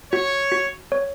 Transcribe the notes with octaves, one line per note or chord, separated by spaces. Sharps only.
F#4 C#5
F#4
C#5